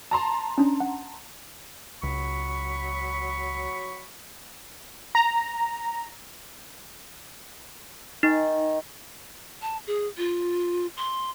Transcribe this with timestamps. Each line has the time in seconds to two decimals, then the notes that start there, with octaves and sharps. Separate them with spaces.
0.11 A5 A#5 C6
0.58 C#4 D4
0.80 F#5
2.03 C#2 F#3 B5 C#6
5.15 A#5
8.23 D#3 D#4
9.62 A5
9.87 G#4
10.18 F4
10.97 C6